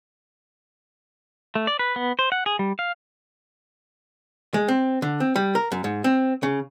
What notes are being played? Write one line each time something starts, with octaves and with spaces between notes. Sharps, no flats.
A3
D5
B4
B3
C5
F#5
G#4
G3
F5
G#3
C4
D3
C4
G3
A#4
F#2
G#2
C4
C#3